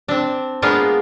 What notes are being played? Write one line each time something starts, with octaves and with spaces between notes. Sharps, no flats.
C4 D4
G#3 A#3 B3 D4 F4